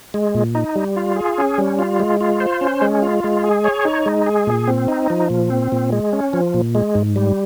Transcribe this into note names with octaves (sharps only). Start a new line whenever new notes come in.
G#3
A#2
D#4
G3
F4
G#4
C#4
G3
F4
G#3
F4
C5
C#4
G#3
F4
G#3
G#4
C#5
D#4
G#3
G#4
A#2
C4
D#4
F3
A#2
C4
A#2
G#3
C#4
F3
A#2
G#3
G#2
G3